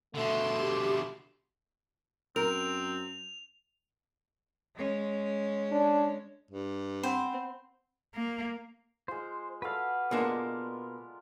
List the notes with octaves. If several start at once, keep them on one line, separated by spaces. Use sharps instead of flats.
B2 D3 A3 E5 C6
G4
F#2 C4 A#4 F7
G#3 C#4
D4
G2
C4 C5 F#5 G5 B5
A#3
G#3 F4 C5
F#4 A4 B4 D5 F5
B2 G#3 A#3 D4 F4 A#4